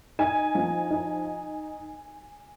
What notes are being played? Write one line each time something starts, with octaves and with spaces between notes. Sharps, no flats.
D#4 G#5
F3
D#4